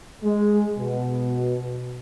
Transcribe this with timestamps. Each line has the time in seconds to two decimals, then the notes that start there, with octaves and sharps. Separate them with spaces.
0.24 G#3
0.78 B2